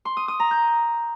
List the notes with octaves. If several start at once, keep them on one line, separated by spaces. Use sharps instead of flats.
C6
D#6
D#6
A#5
G6